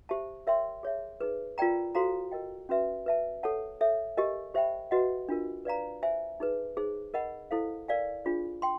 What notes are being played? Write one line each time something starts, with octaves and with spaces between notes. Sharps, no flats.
G4 C5 E5 A5
A#4 C#5 E5 G5 C6
G#4 C#5 E5
D#4 G#4 B4
F4 A#4 D5 G5 A#5
F#4 A4 C5 F5 A#5
A#4 D#5 G5
C#4 F#4 B4 E5
B4 E5 A5
A4 C#5 F#5 A5
A4 C#5 E5
G4 A#4 D#5 G#5
G4 C5 E5 G5 B5
F#4 B4 D#5 F#5
D4 F4 A#4
B4 D5 F5 A#5
C5 E5 G#5
D#4 G#4 B4
D#4 G#4 C5
A#4 D#5 F#5 B5
E4 A4 C5 F5
A#4 D5 F5 G#5
D4 F4 G#4 C5
G5 C6